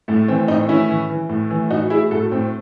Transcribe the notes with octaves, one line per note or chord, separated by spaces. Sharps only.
A2 A3
E3 C4
A2 C4 D#4
E3 C#4 E4
E3
E3
A2
E3
A2 D#4 F#4
F#3 E4 G#4
A2 F#4 A4
A2 C4